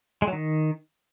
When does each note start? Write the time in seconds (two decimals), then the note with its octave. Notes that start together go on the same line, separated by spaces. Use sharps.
0.22 G#3
0.27 F#3
0.33 D#3